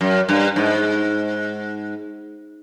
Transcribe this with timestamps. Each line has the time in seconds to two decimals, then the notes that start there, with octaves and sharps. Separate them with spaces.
0.01 F#2
0.29 G2
0.56 G#2